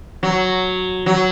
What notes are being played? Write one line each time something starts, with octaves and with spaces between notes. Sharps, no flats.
F#3
F#3